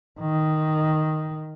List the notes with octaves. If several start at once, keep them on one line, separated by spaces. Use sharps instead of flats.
D#3